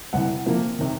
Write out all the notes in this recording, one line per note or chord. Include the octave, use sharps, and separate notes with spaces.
C2 C3 E3 F#5
C3 F3 A#3
C3 D#3